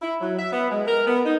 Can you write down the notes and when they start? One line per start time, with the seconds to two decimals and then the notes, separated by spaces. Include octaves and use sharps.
0.02 E4
0.21 F#3
0.39 E5
0.53 B3
0.71 G#3
0.87 A#4
1.07 B3
1.25 D#4